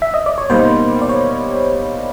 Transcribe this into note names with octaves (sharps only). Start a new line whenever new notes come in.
E5
D#5
D5
C#5
B2 G3 A#3 D#4 C5
D5
C#5